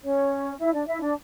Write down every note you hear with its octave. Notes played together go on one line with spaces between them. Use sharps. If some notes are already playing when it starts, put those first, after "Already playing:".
C#4 C#5
E4 E5
D4 D5
E4 E5
D4 D5